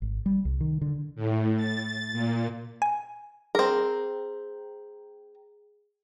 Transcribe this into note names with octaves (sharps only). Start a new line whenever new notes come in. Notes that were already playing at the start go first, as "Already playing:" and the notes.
G#1
G3
C2
D#3
D3
A2
A6
A#2
G#5
C4 G#4 A#4